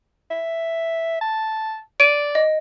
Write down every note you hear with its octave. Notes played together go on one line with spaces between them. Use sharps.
E5
A5
D5 D7 D#7
D#5